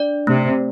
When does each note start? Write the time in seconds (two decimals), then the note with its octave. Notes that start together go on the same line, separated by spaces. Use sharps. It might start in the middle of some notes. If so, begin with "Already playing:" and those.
Already playing: D4 D5
0.27 C3 A3